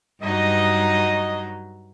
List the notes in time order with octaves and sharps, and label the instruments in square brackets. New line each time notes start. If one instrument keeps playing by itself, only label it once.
[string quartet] G2 F#3 D#4 [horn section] D#5